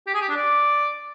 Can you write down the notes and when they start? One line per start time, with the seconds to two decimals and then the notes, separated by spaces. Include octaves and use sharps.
0.07 G4
0.14 G#4
0.21 G4
0.29 D4
0.36 D5